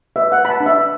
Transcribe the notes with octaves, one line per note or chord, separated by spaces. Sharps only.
B4 E5
F#5
B4
B5
A5
D4
E5